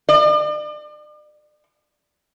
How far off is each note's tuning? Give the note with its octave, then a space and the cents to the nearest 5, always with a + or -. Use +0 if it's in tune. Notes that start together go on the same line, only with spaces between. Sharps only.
D5 +40